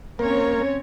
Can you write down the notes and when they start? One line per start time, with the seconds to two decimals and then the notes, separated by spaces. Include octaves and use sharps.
0.19 A#3 C4 C#4 A#4 C#5